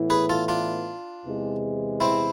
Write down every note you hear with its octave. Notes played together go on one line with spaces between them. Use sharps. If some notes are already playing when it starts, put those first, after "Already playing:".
Already playing: A2 E3 B3 E4
G#4 B4
F4 A4
D4 F4
E2 C3 E3 G#3
C4 E4